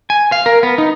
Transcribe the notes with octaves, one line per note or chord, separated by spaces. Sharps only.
G#5
F5
A#4
B3
D#4